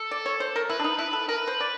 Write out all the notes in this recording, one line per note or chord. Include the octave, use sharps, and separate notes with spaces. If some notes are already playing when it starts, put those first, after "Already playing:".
Already playing: A4
D5
C#5
C5
A#4
E4 B4
D4
D#4
E4 B4
A4
A#4 B4
C5
D5